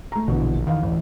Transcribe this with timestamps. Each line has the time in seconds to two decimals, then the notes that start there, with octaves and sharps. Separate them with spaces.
0.12 A3 A#5
0.28 A#1 B2 D3 E3
0.67 E2 D#3 F5
0.83 A1 D2